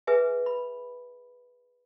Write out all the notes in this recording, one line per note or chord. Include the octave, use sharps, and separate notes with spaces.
G#4 B4 E5 G#5
B5